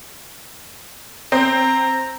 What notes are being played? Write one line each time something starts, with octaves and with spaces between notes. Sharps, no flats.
C4 A#5